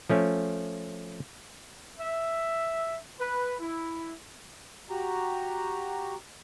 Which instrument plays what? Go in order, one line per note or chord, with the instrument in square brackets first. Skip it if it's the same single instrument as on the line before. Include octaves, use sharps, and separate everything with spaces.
[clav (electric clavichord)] F3 A3 C#4
[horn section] E5
B4
E4
[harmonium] F#4 G4 A#5